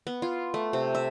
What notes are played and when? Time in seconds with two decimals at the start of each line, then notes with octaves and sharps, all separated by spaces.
0.07 B3
0.22 F4
0.54 A3
0.73 C3
0.95 E5